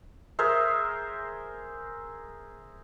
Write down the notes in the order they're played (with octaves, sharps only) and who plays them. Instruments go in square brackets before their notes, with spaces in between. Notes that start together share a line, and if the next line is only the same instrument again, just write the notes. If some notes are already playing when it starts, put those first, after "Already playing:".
[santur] G#4 A#4 C5 E5